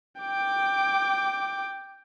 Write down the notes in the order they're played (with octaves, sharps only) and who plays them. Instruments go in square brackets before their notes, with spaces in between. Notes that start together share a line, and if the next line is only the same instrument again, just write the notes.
[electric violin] G5 D6